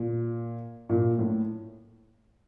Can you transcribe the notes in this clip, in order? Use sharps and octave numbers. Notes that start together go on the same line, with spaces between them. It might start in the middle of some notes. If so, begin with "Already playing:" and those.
Already playing: A#2
A#2
A2